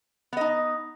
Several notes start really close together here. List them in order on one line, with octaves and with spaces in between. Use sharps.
B3 D#5 D#4